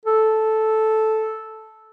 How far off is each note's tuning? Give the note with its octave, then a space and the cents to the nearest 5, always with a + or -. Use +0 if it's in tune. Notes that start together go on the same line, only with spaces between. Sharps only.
A4 -5